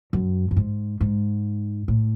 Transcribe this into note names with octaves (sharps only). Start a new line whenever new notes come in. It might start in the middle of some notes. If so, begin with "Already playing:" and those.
F#2
F#2
G#2
G#2
A2